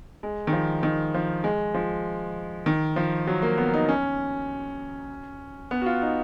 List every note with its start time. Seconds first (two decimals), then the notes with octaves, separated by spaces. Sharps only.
0.23 G#3
0.47 D#3
0.53 F3
0.83 D#3
1.14 F3
1.44 G#3
1.74 F3
2.66 D#3
2.96 F3
3.27 F#3
3.42 A#3
3.58 B3
3.74 D#4
3.89 C#4
5.71 B3
5.82 F#4
5.86 F4
6.02 D#4